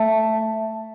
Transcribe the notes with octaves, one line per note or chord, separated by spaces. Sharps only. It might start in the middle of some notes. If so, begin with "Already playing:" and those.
Already playing: A3